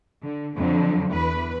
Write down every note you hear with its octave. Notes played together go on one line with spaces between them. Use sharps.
D3
F2 D3 F#3
E2 B4